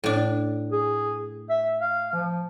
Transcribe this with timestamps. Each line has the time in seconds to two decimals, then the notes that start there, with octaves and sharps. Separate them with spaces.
0.04 A2 D4
0.72 G#4
1.49 E5
1.81 F5
2.13 F3